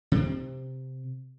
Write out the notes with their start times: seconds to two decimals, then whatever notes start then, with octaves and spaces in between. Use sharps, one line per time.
0.12 C3 C4